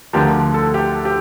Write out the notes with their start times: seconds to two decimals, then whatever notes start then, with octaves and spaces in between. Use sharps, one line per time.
0.13 D2 D3 F3 G4 A#4
0.54 A4
0.74 G4
1.05 G4